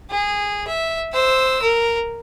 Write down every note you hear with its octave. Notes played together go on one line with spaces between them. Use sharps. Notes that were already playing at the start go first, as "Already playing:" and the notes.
G#4
E5
C5 E6
A#4